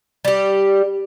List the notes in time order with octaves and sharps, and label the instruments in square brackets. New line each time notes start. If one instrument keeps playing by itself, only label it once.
[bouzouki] G3 G4